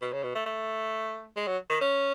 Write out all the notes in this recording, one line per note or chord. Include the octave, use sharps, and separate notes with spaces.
B2
C#3
B2
A3
A3
G#3
F#3
D#3
C#4